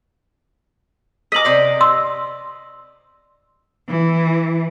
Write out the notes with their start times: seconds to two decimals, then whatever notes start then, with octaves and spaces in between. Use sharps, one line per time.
1.32 D#5 D6 B6 F#7
1.45 C3 C5 D5
1.81 C6 E6
3.89 E3